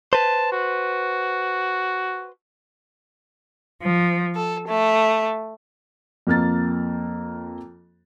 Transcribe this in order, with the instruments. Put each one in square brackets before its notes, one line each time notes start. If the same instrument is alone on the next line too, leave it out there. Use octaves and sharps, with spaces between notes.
[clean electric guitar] B4 C5 [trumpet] A5
[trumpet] F#4
[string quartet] F3
A4
A3
[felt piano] F2 A#3 F6 A6